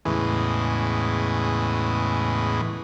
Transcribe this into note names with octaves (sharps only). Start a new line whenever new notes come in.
E2 A2 C#3 E3 G#3